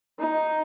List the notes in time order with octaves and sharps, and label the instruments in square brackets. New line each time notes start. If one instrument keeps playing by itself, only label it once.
[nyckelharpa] D#4